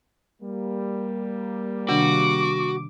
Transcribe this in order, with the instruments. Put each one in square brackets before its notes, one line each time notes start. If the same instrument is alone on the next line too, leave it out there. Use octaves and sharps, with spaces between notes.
[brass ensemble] G3 A#3
[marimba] C3 D#3 D4 [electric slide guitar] F#4 [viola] D6